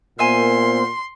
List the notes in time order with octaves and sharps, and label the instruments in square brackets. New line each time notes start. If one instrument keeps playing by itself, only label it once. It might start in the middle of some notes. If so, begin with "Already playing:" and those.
[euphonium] A#2 [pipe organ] B3 A#4 C5 [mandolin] E5 G#5 [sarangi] C6